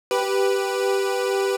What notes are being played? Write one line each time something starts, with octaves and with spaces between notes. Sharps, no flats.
G4 B4